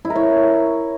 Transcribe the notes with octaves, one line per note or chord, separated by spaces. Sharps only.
E4
A#4
C#5